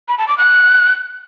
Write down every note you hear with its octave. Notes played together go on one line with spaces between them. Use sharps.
B5
A5
D6
F#6